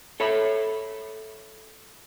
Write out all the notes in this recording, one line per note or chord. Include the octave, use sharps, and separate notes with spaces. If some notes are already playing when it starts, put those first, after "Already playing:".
A4 C#5 E5 B5